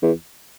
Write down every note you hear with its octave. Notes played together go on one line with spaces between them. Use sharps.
E2